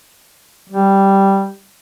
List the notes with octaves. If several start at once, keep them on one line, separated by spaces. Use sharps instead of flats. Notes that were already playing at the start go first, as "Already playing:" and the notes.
G3